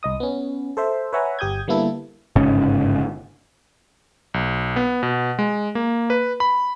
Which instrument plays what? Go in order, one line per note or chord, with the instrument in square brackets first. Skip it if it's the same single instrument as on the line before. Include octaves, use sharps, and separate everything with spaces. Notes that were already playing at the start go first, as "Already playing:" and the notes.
[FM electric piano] C2 D#5 D#6
B3 C#4
A4 C5 E5
B4 C#5 E5 F#5 G#5 A#5
G1 G4 D#6 G6 G#6
D3 G3 A#3 B3 E4 A4
[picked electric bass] G1 G#2 C#3 C#4
[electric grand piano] B1
B3
B2
G#3
A#3
B4
B5